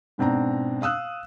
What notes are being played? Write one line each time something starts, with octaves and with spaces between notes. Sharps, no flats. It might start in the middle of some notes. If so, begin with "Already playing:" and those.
G#2 B2 C4 D4 A#5
F5 D#6 E6 F#6